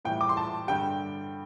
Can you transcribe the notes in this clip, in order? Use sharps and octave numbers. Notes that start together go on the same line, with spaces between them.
A2 E3 G3 G5
D6
C6
A5
G2 D3 G3 G5